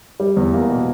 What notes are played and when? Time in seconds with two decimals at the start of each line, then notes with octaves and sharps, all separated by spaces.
0.20 G3
0.37 E2
0.54 A#3
0.70 B2